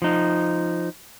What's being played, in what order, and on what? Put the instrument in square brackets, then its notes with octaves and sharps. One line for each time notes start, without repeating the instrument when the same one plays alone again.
[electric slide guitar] F3 D#4